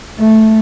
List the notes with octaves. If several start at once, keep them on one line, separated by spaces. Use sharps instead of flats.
A3